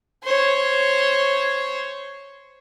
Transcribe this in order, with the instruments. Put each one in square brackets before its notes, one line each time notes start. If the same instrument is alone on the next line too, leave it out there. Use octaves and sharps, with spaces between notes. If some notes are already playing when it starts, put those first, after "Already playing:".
[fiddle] C5 C#5